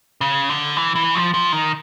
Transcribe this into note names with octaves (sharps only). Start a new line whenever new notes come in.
C#3
D3
E3
E3
F3
F3
D#3